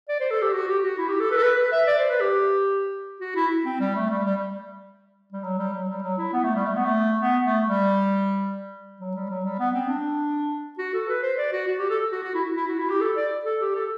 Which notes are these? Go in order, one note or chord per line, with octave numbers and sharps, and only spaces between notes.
D5
C5
A4
G4
F#4
G4
F#4
E4
G4
A4
B4
A4
B4
B4
E5
D5
C5
B4
G4
F#4
E4
C4
G3
A3
G3
G3
G3
F#3
G3
F#3
G3
F#3
E4
B3
A3
G3
A3
B3
A3
B3
A3
G3
F#3
G3
F#3
G3
B3
C4
D4
F#4
A4
B4
C5
D5
F#4
F#4
G4
A4
F#4
F#4
E4
E4
F#4
E4
G4
A4
D5
A4
G4
A4